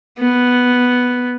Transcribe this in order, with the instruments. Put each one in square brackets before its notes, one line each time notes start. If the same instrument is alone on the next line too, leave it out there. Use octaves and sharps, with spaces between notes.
[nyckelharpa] B3